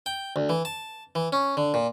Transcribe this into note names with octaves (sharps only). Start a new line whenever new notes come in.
G5
D2
E3
A5
E3
C#4
D3
A#2